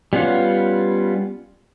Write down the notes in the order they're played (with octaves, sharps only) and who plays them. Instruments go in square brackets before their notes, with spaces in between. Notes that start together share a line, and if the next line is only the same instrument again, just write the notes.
[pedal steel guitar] G3 B3 C#4 F4 F#5